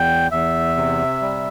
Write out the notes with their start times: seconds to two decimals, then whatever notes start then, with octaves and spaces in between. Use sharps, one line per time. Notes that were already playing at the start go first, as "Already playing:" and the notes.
Already playing: E2 G5
0.31 E2 E5
0.76 C3
1.22 G3